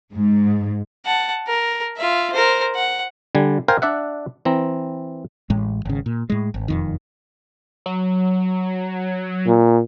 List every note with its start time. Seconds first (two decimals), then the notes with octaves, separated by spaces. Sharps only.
0.14 G#2
1.05 F#5 A5
1.47 A#4
1.97 F4 E5
2.33 A#4 C5
2.75 F#5
3.35 D3 G3 G#5
3.68 A#4 C5 F5 G5 G#5
3.82 D4 D5 E5 F#5
4.45 E3 C4 A#5
5.50 A1 A2 G#3
5.85 G#1 C#3
6.06 A#2
6.30 A2 G#3
6.54 G#1
6.68 E1 F2 D#3
7.86 F#3
9.47 A#2